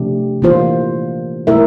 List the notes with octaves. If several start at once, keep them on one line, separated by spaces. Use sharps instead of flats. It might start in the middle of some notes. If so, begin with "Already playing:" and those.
Already playing: C3 F3 A3 D4 G4
E3 A#3 F4 C5
A3 E4 A#4 E5